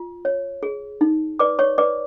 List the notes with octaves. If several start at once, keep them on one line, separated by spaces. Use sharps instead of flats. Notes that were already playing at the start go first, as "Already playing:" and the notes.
Already playing: F4
C#5
G#4
D#4
B4 D5 D6
C#5 C#6
B4 D5 D6